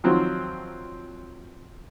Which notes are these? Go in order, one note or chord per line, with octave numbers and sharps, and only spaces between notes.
D#3 F3 F#3 C4